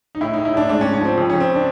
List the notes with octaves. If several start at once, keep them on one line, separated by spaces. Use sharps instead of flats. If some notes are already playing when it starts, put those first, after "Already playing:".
D#4
A2 E4
A2 D#4
E4
A2 D4
G#2 D4
C#4
G#2
C#4
F3 C4
F2
F2 C#4
C4
D4